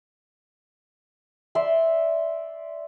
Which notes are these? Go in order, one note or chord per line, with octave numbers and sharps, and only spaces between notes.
D5 E5 C6